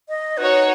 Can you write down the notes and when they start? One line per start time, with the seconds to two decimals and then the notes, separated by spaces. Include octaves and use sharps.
0.09 D#5
0.37 D#4 F#4 B4 C#5 F#5